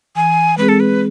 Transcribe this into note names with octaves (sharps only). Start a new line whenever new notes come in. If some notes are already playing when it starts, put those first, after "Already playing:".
E3 G#5
G#3 C4 G#4 B4
A4
B4